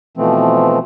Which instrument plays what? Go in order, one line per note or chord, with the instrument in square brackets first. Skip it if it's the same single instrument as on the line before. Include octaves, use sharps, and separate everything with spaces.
[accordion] B2 E3 F3 A3 C4